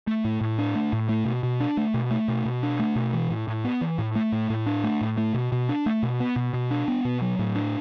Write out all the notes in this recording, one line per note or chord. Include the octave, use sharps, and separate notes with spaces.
A3
A2
A2
D4
A3
A2
A3
B2
B2
D4
A3
B2
A3
B2
B2
D4
A3
B2
E3
A2
A2
B3
E3
A2
A3
A2
A2
D4
A3
A2
A3
B2
B2
D4
A3
B2
B3
B2
B2
D4
B3
B2
F#3
A2
D4